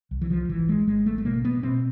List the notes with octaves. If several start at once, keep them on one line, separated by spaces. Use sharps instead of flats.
C2
E3
F3
G#1 E3
G#3
G#1 G#3
A3
A3
B2 A#3
B3
B2 C4